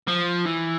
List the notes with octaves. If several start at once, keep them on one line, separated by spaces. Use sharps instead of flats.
F3
E3